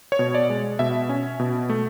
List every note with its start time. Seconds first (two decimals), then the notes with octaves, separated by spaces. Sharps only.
0.12 C#5
0.19 B2
0.35 D5
0.50 G#3
0.79 B2 E5
1.09 C#4
1.40 B2
1.70 A3